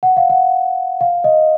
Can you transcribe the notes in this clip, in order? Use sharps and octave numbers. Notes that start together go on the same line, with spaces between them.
F#5
F5
F#5
F5
D#5